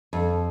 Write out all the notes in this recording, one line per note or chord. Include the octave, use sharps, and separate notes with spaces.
F2